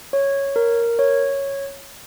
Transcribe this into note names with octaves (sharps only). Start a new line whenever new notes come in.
C#5
A#4
C#5